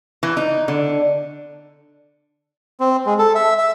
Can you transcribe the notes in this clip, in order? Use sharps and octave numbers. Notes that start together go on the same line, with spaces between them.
E3
D#4
D3
C4
G#3
A4
E5
E5